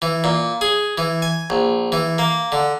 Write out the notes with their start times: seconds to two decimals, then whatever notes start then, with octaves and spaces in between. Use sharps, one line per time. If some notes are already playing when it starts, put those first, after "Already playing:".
0.02 E3
0.24 A#2
0.61 G#4
0.98 E3
1.22 G#5
1.50 A#1
1.92 E3
2.18 A#3
2.52 D3